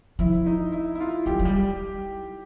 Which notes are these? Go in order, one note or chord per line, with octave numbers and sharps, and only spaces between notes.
F3 E4
D#4
E4
E4
F4
F#3 G4
F#3
G3